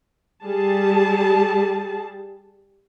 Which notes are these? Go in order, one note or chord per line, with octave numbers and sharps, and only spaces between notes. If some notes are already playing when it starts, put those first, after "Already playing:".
G3 G#4 A5